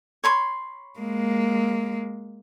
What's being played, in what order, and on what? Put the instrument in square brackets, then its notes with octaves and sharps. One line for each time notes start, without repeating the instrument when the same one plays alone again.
[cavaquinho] C#5 B5 C6
[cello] G#3 A#3